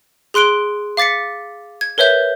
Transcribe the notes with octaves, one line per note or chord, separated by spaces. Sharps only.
G#4 C6 F#6 D7 G7
F5 D6 A6 B6 C#7
G#6
A#4 B4 C#5 E5 G6